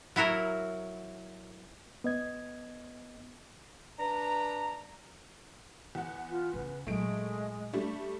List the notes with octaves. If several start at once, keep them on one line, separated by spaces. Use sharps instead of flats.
F#3 E4 F#4 A#4
B3 D#5 G#6
D4 B4 A#5
E2 F#5
F4
C#3 B4
A#2 F#3 G#3 A3 D7
G3 A3 D4